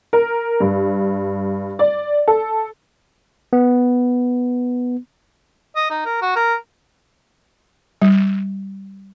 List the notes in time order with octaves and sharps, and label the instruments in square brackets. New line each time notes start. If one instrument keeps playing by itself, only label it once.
[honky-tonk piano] A#4
G2
D5
A4
[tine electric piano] B3
[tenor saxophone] D#5
D#4
A#4
F#4
A#4
[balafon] G3